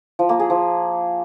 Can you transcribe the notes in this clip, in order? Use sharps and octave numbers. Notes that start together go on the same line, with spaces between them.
F3
A#3
G#4
F3